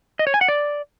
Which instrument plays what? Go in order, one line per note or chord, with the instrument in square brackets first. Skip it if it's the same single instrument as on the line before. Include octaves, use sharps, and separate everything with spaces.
[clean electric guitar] D#5
C#5
G#5
F#5
D5